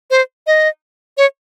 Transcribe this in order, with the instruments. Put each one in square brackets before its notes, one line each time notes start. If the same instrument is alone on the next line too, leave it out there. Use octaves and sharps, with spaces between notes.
[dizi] C5
D#5
C#5